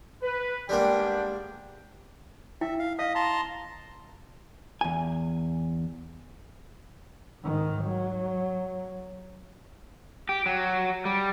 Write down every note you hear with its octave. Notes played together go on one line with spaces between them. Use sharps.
B4
G3 G#3 A#3 B3 D4 G5
E4 E5 G5
F5
D#5 F5 D#6
A5 A#5 C6
E2 G#5
G#2 D#3
F#3
G4
F#3
G3